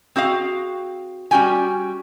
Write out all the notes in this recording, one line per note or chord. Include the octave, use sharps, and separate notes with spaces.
C4 F#4 G#4 F5
G3 C#4 F#4 G5 G#5